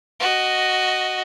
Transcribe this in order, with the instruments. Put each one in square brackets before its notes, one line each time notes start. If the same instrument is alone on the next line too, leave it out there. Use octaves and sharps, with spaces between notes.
[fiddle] F#4 D#5